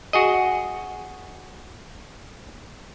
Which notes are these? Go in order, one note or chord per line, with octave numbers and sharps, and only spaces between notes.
F#4 G#4 D#5